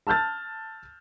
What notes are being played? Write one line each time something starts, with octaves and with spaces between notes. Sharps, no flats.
A5 E6 F6 G6 A6